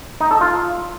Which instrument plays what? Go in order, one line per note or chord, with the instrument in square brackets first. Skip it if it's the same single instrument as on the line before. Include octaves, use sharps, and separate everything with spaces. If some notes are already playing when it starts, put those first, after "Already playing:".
[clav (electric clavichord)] D#4
A4
F4